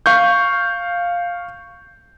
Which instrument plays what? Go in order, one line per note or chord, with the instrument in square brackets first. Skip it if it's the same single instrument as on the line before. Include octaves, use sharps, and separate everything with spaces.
[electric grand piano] F5 C#6 G6